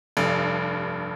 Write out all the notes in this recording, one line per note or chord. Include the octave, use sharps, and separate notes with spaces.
F1 G2